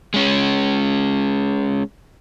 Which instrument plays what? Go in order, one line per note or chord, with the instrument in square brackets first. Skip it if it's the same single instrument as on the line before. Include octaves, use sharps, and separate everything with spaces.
[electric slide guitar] G#3 C#4